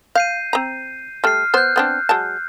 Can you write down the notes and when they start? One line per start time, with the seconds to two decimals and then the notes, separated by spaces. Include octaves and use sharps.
0.15 F5 G6 C7 D#7
0.53 C4 A#5
1.24 G3 A3 F6 C7
1.54 B3 C5 F#6 G6
1.76 B3 C4 D4
2.09 F#3 G#3 A5